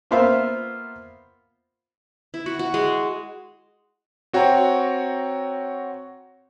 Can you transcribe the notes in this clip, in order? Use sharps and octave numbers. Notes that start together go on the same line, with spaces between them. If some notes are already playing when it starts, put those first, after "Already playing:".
A#3 B3 F4 C5 E5 F5
E4
F#4
F#4
G#3
C4 F#4 C#5 G5 A#5